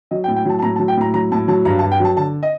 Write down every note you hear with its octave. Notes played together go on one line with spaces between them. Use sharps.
F#3 D#5
G5
A2
G5
F#3 A5
A5
A2 A#5
A5
F#3
G5
A2 A#5
F#3 A#5
A2 A5
F#3 A5
G2 A#5
A5
G2
G5
F#3 A5
D3 A5
D#5